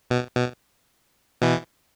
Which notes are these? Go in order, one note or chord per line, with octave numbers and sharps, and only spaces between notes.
B2
B2
B2 E3